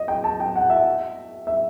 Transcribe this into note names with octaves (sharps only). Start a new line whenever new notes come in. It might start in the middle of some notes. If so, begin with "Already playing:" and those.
Already playing: D#5
G5
A5
G5
F#5
E5
E5